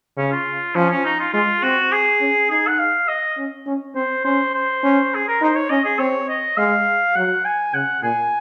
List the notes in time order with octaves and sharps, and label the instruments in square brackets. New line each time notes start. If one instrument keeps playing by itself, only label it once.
[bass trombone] C#3 [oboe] C#4
[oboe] F4
[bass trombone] F3 [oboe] C#4
[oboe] C#4
D#4
F4
[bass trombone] G#3 [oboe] F4
[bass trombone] C4 [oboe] F#4
[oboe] G#4
[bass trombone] C#4
[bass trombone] D#4 [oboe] G#4
[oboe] F#5
F5
D#5
[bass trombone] C#4
C#4
[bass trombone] C4 [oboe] C5
[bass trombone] C#4 [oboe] C5
[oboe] C5
[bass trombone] C#4
[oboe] G#4
A#4
[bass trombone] D#4 [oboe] C5
[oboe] C#5
[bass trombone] C#4 [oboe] D#5
[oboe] G#4
[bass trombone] C4 [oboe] C#5
[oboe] D#5
[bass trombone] G#3 [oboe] F5
[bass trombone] F#3 [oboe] F#5
[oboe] G#5
[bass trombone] C#3 [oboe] F#5
[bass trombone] A#2 [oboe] G#5